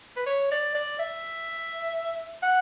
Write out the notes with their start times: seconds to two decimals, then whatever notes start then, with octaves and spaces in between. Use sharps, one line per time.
0.17 B4
0.26 C#5
0.51 D5
0.74 D5
0.99 E5
2.43 F#5